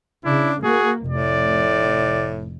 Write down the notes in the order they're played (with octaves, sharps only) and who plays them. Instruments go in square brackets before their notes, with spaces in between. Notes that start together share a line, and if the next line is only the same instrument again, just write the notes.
[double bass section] C#3 [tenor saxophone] D4 [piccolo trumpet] E4
[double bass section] A#3 [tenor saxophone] F#4 [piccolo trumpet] G#4
[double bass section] F1 [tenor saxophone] A2 [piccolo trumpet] D5